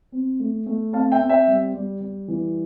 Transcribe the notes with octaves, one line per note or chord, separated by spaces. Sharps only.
C4
A3
A3
C4 F5 A5
E5 G5
C4
E5 G5
G3
G3
G3
E3